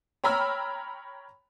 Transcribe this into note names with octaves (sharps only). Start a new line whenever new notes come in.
C#5 G5 A#5 B5 E6 F6